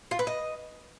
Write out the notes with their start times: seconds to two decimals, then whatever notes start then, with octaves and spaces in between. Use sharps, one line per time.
0.11 F4
0.19 B4
0.27 D#5